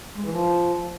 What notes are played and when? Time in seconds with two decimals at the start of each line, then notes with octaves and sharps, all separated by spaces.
0.15 G#3
0.23 E3
0.31 F3